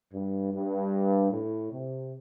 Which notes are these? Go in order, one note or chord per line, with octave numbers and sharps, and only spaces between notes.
G2
G2
A2
C3